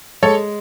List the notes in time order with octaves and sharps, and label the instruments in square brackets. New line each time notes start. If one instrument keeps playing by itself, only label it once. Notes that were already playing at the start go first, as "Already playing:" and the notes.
[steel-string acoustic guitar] G#3 [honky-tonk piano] A4 C#5